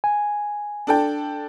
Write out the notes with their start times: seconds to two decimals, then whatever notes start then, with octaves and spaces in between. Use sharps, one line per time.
0.04 G#5
0.87 D4 A4 G5